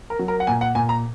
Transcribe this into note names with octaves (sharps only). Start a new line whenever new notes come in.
A#4
F#3
A#4
F#5
A#2 G#5
F#5
A#2 G#5
A#5